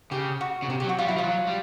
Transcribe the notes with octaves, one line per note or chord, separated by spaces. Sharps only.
C#3 G4
F#4
C#3
C3 G4
G4
F#3
F#4
G3 F4
F#3 E4
F3 F4
F#3
G3